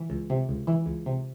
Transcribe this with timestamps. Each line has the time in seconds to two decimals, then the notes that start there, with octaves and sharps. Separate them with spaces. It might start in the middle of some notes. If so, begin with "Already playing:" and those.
Already playing: E3
0.10 C#2
0.30 C3
0.49 C#2
0.67 E3
0.86 C#2
1.06 C3